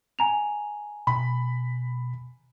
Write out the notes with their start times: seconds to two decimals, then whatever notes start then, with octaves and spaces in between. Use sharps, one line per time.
0.19 G#5 A#5 F7
1.07 B2 B5